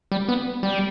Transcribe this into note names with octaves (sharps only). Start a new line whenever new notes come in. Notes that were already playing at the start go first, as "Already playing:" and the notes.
G3
B3
G3